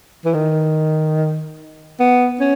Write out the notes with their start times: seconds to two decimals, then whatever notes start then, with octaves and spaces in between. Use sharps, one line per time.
0.25 E3
0.34 D#3
2.00 B3
2.40 C#4